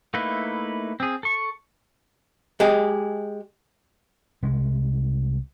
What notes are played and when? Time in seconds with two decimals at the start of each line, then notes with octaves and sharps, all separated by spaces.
0.14 A3 A#3 D#4 E4 B4
1.00 C4 G#4
1.23 A4 C#6
2.60 G#3 G4 G#4
4.42 C2 G#3